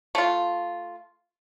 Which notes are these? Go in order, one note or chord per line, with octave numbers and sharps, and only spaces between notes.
A3 F4